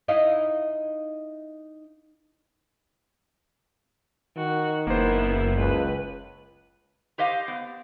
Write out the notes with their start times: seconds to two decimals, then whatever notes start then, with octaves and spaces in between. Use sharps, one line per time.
0.08 D#4 E4 F5
4.37 D#3 F#4
4.87 F#1 A#3 B3 E4 C5
5.57 C#2 B4
7.18 G4 C5 D#5 F5
7.48 B3